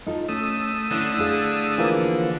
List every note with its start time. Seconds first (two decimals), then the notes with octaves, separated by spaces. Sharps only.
0.07 D#4 F4 A4
0.28 A3 C#4 D#6 E6
0.91 D3 C#4 E4
1.18 D4 G#4 F5
1.78 E3 F3 A#3